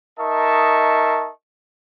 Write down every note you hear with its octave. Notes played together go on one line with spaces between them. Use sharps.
D#4 A#4 D#5 E5 A5 C#6